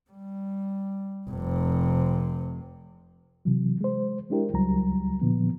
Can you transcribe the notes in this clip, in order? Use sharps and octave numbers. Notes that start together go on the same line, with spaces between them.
G3
F1 C3
C3 E3 F#3
G#3 C5
G#3 D4 E4 G4 A#4
C#2 F#3 G3 A#5
A#2 D3 F3 B3